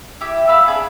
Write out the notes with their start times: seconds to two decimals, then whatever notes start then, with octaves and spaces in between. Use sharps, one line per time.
0.21 E4 G4 D6
0.48 E5 F5 B5 E6
0.68 D4 G#4